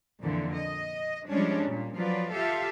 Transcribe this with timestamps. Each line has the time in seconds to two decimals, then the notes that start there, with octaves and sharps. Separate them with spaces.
0.20 F2 A#2 D3 E3
0.53 D#5
1.29 F3 G3 G#3 C#4 D4
1.65 A#2
1.95 F3 F#3 F4 B4 D5
2.33 F4 G4 A4 E5 F5